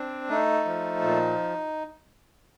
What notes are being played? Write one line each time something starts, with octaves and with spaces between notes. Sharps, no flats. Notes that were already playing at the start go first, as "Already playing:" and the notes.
Already playing: C4 D4
A3 D#4
F3
A#2